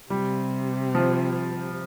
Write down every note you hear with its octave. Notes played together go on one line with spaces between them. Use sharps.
C3 G3
F3